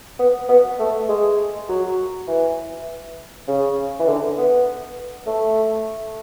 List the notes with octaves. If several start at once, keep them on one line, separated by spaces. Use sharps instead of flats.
B3
B3
A3
G#3
F#3
E3
C#3
E3
D3
B3
A3